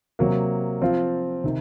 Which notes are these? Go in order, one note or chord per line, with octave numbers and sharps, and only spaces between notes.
C3 F#3 A#3
F3 C4 F4
C3 D#3